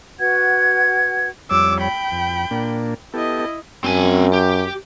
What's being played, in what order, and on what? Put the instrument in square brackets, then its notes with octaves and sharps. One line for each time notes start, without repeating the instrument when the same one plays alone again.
[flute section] F#4 B4 F#5 G#6
[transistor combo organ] F2 G3 C#5 [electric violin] D6 E6
[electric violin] G5 B5
[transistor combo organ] F2
A#2 A#3 D4
[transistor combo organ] B3 G4 A4 [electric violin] E4 D#5
[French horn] F#2 [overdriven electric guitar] C4 G#5
[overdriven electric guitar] G4